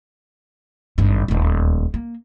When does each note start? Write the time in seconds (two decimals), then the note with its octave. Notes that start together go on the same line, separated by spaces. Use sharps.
0.98 G#1 G2
1.28 D#1 D2
1.94 A#3